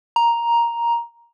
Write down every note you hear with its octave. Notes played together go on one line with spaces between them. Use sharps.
A#5